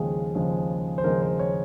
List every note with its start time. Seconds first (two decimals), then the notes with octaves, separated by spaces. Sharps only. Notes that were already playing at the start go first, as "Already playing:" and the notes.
Already playing: D#2 C#3 F3 G#3 G#4
0.35 D#2 C#3 F3 G#3
0.98 C5
1.04 D#2 C#3 F3 G#3 A#4
1.22 C5
1.39 C#5